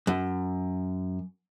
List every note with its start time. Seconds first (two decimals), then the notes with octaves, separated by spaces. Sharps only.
0.07 F#2